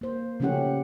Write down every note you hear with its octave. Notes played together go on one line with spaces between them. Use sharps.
A#3 C5
C#3 F3 A3 C#4 G4 F#5